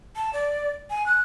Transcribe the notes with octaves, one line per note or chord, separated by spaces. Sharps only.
A5
D5
G#5
F#6